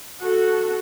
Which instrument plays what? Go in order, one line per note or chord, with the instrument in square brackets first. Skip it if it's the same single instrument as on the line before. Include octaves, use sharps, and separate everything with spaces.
[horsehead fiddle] F#4 A4